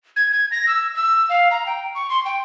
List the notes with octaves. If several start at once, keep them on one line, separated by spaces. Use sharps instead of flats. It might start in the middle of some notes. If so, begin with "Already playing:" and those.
G#6
G#6
A#6
E6
E6
F5
A#5
G5
C#6
C6
G5